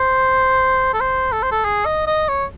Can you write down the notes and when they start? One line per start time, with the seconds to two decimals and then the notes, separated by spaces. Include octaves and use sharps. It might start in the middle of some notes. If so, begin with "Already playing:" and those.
Already playing: C5
0.94 A4
1.01 C5
1.32 A4
1.42 C5
1.52 A4
1.65 G#4
1.86 D#5
2.07 D#5
2.28 C#5